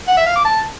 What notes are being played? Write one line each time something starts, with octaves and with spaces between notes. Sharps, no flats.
F#5
E5
F5
D6
A5